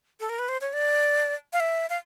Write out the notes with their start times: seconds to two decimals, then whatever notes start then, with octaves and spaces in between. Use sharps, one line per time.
0.20 A4
0.29 A#4
0.39 B4
0.49 C5
0.61 C#5
0.73 D5
1.53 F5
1.60 E5
1.90 F5